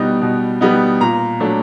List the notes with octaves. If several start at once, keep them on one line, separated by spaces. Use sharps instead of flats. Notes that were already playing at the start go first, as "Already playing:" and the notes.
Already playing: B2 G3 B3 D#4
B2
G3 B3 D#4
A#2 A#5
F#3 A3 D4